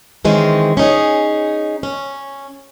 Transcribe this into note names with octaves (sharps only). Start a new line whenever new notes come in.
D#3 E3 G#3 C4 C#4
C#4 D#4 G#4
C#4